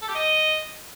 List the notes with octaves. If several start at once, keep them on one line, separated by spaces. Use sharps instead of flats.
A4
G4
D#5